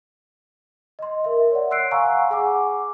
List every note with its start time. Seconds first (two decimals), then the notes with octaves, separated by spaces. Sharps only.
0.99 D#5 C6
1.24 A#4 E5
1.51 C#5 D5 F#5
1.71 C6 E6 F#6 C7 D7
1.91 F5 F#5 G#5 A#5 C#6 E6
2.30 G#4 F#5 G#5 D6